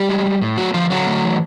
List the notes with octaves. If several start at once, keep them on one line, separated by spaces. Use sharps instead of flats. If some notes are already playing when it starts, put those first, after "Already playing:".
Already playing: G3 G4
G#3
G#3
A2
F#3 A3 F#4
D3 F3 F4
D3 F#3 F#4
A3
E3